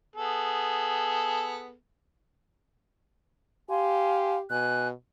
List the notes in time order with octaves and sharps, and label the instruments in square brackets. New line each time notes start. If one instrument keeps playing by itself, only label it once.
[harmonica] B3 G#4 A4
[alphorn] G4 [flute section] F5 G#5 C6
[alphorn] B2 [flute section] G#5 F#6